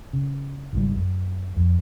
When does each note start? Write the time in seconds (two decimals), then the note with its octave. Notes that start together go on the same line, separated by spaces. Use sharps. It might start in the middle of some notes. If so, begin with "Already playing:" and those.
0.13 C#3
0.73 G#1 C#2 G3
0.98 F#2
1.57 F2